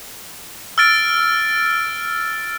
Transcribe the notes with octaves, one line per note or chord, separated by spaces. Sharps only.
E6 F6 A6 D7